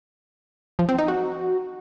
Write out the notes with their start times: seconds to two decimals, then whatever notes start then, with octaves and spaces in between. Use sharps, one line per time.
0.79 F3
0.89 C4
0.98 D#4
1.08 F#4